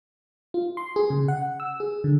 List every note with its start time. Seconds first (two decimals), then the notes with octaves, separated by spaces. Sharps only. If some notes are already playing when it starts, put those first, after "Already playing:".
0.54 F4
0.77 C6
0.96 G#4
1.10 C#3
1.28 F#5
1.60 E6
1.80 G#4
2.04 D3